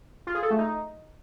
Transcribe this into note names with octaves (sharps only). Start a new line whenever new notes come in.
F4
G#4
A4
A3
D#4